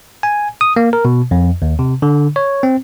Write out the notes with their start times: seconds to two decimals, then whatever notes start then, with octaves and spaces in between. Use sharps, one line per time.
0.23 G#5
0.61 D#6
0.76 A#3
0.93 A#4
1.05 B2
1.31 F2
1.62 D#2
1.79 C3
2.02 D3
2.36 C#5
2.63 C4